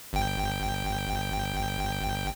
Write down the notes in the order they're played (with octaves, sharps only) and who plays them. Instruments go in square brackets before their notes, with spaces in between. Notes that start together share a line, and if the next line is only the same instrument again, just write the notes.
[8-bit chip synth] G1 G5